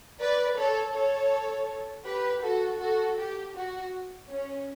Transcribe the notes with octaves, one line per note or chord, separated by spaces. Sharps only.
B4 D5
A4 C#5
A4 C#5
G4 B4
F#4 A4
F#4 A4
G4
F#4
C#4